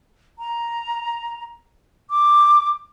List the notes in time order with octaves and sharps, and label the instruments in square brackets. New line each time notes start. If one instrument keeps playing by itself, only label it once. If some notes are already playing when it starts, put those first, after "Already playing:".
[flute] A#5
D6